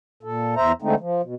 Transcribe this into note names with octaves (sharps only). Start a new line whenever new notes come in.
A#2 A4
E2 C5 E5 A#5
D3 G#3 A3 C4 D#4
F3
B2